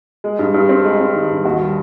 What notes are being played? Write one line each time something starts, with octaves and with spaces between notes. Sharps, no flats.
G#3
G2
G2
C4
G#3
C4
D#3
G2
D#2 F#4
G3